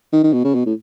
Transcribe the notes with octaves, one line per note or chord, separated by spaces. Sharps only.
D#3
D#3
B2
C#3
B2
A2